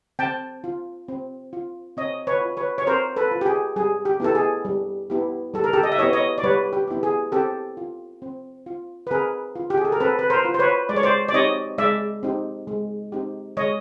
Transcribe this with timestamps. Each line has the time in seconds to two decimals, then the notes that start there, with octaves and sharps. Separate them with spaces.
0.19 C4 G5 A5
0.64 F4
1.08 C4
1.53 F4
1.97 C4 C#5 D#5
2.27 B4 C#5
2.42 F4
2.57 B4 C#5
2.78 C#5
2.87 C4 A#4 C5
3.16 A4 B4
3.31 F4
3.41 G4
3.46 G#4
3.76 G3 G#4
4.05 G4
4.20 B3 E4 G4 A4
4.35 G#4
4.65 G3
5.10 B3 E4 G4
5.54 G3 A4
5.64 A#4
5.73 G4 A4
5.83 D#5
5.92 E5
5.99 B3 E4 G4 C#5 D#5
6.13 C#5 D#5
6.38 D5
6.43 G3 B4 C#5
6.73 G4
6.88 B3 E4 G4
7.03 G#4
7.32 C4 G4 A4
7.77 F4
8.22 C4
8.66 F4
9.07 B4
9.11 C4 G#4 A#4
9.56 F4
9.70 G4
9.77 G#4
9.85 A4
9.92 A#4
10.00 C4 A4 B4
10.19 B4
10.30 A#4 C5
10.45 F4
10.54 C5
10.59 B4 C#5
10.89 G#3 D5
10.96 C#5
11.03 C5 D5
11.29 D5
11.34 C4 D#4 G4 C#5 D#5
11.78 G#3 D5 E5
12.23 C4 D#4 G4
12.67 G#3
13.12 C4 D#4 G4
13.57 G#3 C#5 D#5